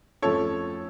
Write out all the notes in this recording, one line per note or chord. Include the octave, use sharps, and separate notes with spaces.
F2 F3 A3 C#4 A4 C#5